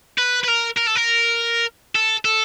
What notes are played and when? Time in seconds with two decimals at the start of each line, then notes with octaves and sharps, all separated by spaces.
0.18 B4
0.44 B4
0.48 A#4
0.78 A#4
0.87 A4
0.96 A#4
1.95 A4
2.25 A4